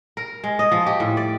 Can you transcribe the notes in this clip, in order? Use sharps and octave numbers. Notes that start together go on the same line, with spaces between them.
A#4
G#3
D#5
F3
G4
A2
D5